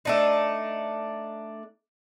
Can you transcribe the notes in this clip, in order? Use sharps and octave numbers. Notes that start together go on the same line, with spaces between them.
A3 D4 D#4